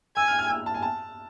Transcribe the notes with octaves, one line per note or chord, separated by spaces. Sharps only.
G#5 E6
F6
F6
E6
A5
G#5
A5